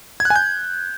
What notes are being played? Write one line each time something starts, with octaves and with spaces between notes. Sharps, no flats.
G#6
F#6
G#5
G6